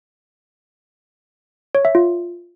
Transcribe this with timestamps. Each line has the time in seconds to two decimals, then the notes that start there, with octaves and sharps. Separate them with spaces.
1.75 C#5
1.85 E5
1.95 F4